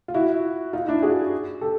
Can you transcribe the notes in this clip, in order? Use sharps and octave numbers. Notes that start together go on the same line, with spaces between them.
F4
E4 F#4
D#4 F4
D4 E4
F#4 G#4
G4 A4